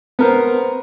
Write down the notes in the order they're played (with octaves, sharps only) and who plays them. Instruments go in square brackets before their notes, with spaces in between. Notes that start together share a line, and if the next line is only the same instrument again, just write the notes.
[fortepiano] B3 A#4 C5